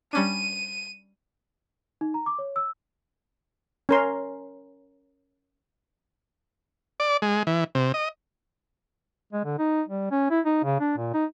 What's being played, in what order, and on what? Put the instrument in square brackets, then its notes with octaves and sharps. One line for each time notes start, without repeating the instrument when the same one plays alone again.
[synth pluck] G3 C#4 D4 [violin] D#7
[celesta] D#4
A#5
D6
C#5
E6
[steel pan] C#4 A#4 C6
[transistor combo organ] D5
G#3
E3
C3
D#5
[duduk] G#3
D3
D#4
G3
C#4
E4
D#4
C#3
D4
A#2
D#4